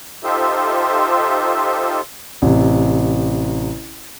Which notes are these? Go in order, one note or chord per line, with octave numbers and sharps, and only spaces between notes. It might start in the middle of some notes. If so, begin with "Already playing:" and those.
D#4 F4 G4 A4 C5 E5
A1 C3